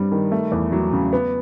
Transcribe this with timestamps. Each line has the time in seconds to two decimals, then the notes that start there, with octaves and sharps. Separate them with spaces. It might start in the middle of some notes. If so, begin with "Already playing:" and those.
Already playing: G2 G3 C4
0.12 D#3
0.32 A3
0.52 E2
0.72 F#3
0.93 C#3
1.13 B3